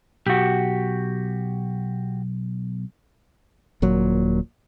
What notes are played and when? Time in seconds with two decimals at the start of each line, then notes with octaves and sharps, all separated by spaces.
0.27 B1 F#4 G4
3.82 D#1 A#2 F#3